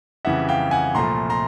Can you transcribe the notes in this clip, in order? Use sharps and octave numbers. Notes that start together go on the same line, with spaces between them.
F2 C#3 E3 G3 E5 F#5
F5 G5
F#5 G#5
C2 A#2 F3 A3 A#5 C6
A#5 C6